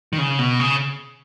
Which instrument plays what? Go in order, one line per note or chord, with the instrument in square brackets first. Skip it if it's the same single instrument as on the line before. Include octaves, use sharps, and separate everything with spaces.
[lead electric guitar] D#3
C#3
B2
C#3